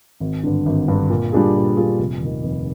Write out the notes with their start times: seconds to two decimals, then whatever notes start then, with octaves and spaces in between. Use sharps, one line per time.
0.20 G#1
0.44 G2 D3
0.66 G#1
0.88 G2 D3
1.09 A#2
1.32 G3 D4 F4 G#4
1.55 A#2
1.76 G3 D4 F4 G#4
1.99 F1
2.21 D#2 D#3
2.43 F1